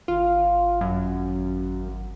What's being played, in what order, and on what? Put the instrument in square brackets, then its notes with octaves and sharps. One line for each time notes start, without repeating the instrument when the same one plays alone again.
[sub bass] G#1 [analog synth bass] F4
[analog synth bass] F#2